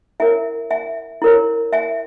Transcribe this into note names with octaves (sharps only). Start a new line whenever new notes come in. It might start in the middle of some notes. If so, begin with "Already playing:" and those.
E4 A#4 C#5 E5 G#5
E5 G#5
E4 A#4 C#5
E5 G#5